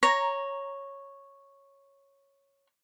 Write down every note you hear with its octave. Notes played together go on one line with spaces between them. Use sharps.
C#5 A#5